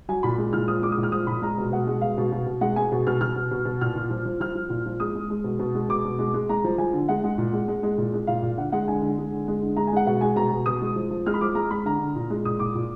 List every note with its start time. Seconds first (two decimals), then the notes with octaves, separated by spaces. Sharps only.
0.09 F#3 G#5
0.23 A#2 B5
0.38 G#3
0.53 A#2 F6
0.68 F3 D#6
0.82 G#3 D6
0.92 D#6
0.98 A#2
1.03 F6
1.12 F3 D#6
1.27 A#2 B5
1.42 G#3 A#5
1.58 B2
1.72 B2 F#5
1.87 G#3
2.01 B2 F5
2.18 B2
2.32 B2
2.46 B2
2.61 G#3 F#5
2.76 G#3 G#5
2.92 B2
3.07 B2 F6
3.21 B2 F6
3.36 B2
3.51 B2
3.65 B2
3.81 A#2 F6
3.95 A#2
4.10 F3
4.25 F3
4.40 F3 F6
4.55 F3
4.70 A#2
4.86 F3
5.00 G#3 D#6
5.15 G#3
5.30 G#3
5.44 B2
5.59 B2
5.75 G#3
5.89 B2 D6
6.05 B2
6.19 G#3
6.34 G#3
6.49 G#3 A#5
6.64 F3
6.78 F3 G#5
6.93 D3
7.08 G#3 F#5
7.24 G#3
7.38 A#2
7.53 G#3
7.68 G#3
7.83 G#3
7.98 A#2
8.14 G#3
8.27 A#2 F5
8.42 A#2
8.57 D3 F#5
8.72 G#3 F#5
8.88 D3 G#5
9.02 D3
9.18 G#3
9.32 D3
9.48 G#3
9.62 D3
9.77 G#3 A#5
9.87 G#5
9.92 G#3 F#5
10.06 B2 F#5
10.21 G#3 G#5
10.36 B2 A#5
10.51 B2
10.66 B2 D#6
10.82 G#3
10.96 F3
11.10 F3
11.26 G#3 F6
11.34 B5
11.41 F3 D6
11.55 G#3 A#5
11.70 G#3 B5
11.85 D3 A#5
12.00 D3
12.16 A#2
12.30 G#3
12.45 A#2 D#6
12.59 A#2 D6
12.75 A#2